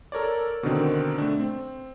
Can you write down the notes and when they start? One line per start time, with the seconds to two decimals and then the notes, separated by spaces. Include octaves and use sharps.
0.12 A4 A#4 C#5 D5
0.63 B2 D3 D#3 C4
1.18 A3 D4
1.40 C4